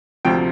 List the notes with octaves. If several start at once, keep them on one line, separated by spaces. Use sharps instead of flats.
D2 C3 F3 G5